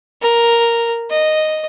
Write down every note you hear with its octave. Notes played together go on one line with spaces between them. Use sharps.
A#4
D#5